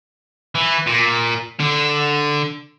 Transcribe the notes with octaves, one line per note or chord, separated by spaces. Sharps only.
E3
A#2
D3